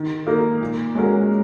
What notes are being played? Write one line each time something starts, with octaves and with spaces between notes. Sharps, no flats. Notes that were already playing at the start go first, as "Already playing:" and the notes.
Already playing: D#3
A#3 D#4 A#4
A#2
G#3 C#4 F#4 A#4